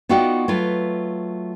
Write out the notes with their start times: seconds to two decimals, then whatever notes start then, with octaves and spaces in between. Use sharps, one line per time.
0.09 B3 D#4 F4 F#4 D5 G5
0.48 F#3 A3 F4 B4